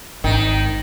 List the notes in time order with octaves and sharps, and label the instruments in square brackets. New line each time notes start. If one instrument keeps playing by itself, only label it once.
[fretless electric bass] G#1 [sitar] D#3